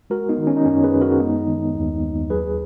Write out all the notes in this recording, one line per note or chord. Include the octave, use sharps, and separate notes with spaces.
G#3 F#4 A#4
B3 D#4
D#3
C#4
D#4
F#2 C#4
G#4 B4
F#2
F#4 A#4
G#3 B3 D#4
D#3
D#2
D#2
F#3 G#4 B4